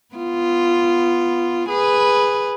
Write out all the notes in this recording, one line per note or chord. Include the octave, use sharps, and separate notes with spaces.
B3 F4
G#4 B4